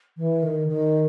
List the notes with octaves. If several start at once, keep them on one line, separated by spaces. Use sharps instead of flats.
E3
D#3
D#3